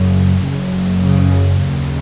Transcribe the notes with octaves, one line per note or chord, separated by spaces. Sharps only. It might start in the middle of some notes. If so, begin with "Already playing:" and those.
Already playing: F#1 F#2 C#3
F#1 F#2 C#3
C#3
D#2 C#3